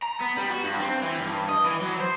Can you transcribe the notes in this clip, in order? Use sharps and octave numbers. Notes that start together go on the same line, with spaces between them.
A#5
B3
G3
F#4
G2
C4
E3
G2
D#5
E3
F#3
C5